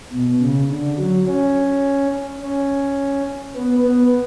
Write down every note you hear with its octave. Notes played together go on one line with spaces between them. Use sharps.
B2
C#3
D3
F#3
C#4
C#4
B3
B3